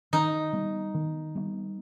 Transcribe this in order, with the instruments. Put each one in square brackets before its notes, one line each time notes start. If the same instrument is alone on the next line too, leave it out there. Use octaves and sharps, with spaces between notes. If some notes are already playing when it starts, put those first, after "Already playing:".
[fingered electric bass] D#3 [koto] D#4
[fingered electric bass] G3 B3
D#3
G3 B3